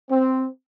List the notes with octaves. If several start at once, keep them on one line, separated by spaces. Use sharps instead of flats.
C4